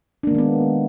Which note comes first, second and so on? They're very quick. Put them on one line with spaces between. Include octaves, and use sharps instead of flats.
D4 A#3 D#3 G#3 B3